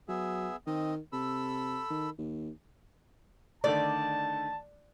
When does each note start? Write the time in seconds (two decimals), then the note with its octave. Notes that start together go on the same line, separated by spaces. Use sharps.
0.08 F#3 B3 G#4 E5
0.67 D#3 C4 D#5
1.13 C3 A4 B5 E6
1.90 D#3
2.18 D#2
3.64 D3 D#3 A3 D5 A5